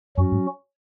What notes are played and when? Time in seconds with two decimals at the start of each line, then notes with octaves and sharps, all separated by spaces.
0.17 F#2 F#3 C#4 F#4
0.32 G#2